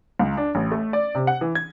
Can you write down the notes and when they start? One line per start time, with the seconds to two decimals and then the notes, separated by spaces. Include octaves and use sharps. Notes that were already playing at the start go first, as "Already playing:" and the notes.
0.19 C#2
0.37 D4
0.55 A1
0.71 A3
0.93 D5
1.15 C3
1.27 F#5
1.41 E3
1.55 G#6